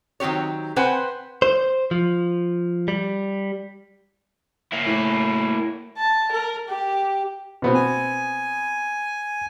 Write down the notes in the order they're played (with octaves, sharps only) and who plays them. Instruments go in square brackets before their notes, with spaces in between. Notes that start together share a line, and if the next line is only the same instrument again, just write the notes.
[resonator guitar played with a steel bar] D#3 F#3 C4 G4 C#5
C4 B4 C5 F#5 G#5
[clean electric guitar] C5
F3
G3
[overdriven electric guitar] A#3 E4
[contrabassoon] A2
[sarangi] A5
A#4
G4
[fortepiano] B2 B3 C4
[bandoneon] G#5